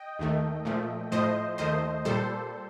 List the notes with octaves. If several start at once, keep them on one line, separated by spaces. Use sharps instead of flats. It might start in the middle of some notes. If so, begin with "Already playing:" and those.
Already playing: D#5 G5
D#2 D#3 A3
A#2 F3 A3
A2 F3 A3 C5 D#5
D#2 D#3 A3 C5 D#5
A#2 G3 A4 C5